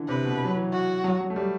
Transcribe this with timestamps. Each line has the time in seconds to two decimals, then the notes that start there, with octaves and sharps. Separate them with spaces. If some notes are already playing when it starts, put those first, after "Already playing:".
Already playing: D3 E3
0.08 C3 B4
0.25 B2
0.45 F#3
0.56 E3
0.72 F#4
1.04 F#3
1.21 F#3
1.30 A3
1.36 G3